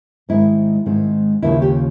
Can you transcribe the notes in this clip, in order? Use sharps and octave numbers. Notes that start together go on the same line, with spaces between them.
G#2 D#3 G#3 C4 E4
G#2 D#3 G#3 C4
D#2 C#3 F3 E4
G4